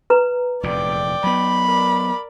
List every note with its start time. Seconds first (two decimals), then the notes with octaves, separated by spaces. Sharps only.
0.10 B4 A#5
0.63 F1 E2 A#2 D5 G5
1.24 F#3 B3 B5
1.65 A#4 D5